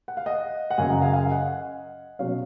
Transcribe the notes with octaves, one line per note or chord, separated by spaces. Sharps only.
F#5
F5
D#5 F#5
F#5
F#2 C#3 F#3 F5 G#5
F#5 A#5
F5 G#5
F5 G#5
D#5 F#5
B2 F#3 C#4 C#5 F5